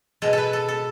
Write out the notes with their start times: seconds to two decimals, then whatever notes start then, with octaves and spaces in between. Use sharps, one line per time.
0.22 B2 G#3 A4
0.33 A4 B4
0.53 A4
0.68 A4